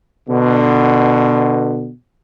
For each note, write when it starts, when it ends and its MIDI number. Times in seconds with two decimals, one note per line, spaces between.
0.29 1.90 47
0.29 1.90 50